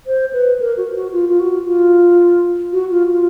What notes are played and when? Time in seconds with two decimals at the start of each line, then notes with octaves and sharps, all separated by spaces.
0.07 C5
0.33 B4
0.60 A#4
0.77 F#4
0.95 F#4
1.12 F4
1.29 F4
1.40 F#4
1.66 F4
2.73 F#4
2.91 F4
3.09 F4